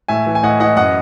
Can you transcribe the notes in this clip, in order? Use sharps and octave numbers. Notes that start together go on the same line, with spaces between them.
A2 E5 G#5
E3
G#5
A2 D#5 F#5
E3 D#5 F#5
F#2 D#5 F#5